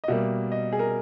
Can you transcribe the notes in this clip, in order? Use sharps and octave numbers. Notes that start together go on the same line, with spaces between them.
D#5
B2 G3 A#3 E5
D#5
G#4
A#4